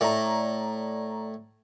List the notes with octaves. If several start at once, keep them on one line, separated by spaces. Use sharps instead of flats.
A2 D5 A#5